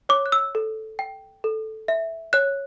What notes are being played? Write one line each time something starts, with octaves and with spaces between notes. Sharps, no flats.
C#5 D6
F#6
E6
A4
G5
A4
E5
C#5 F#6